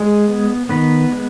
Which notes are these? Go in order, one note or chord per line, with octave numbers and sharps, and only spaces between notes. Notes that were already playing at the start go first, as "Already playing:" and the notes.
Already playing: G#3 G#4
B3
D#3 B3 B4
G#3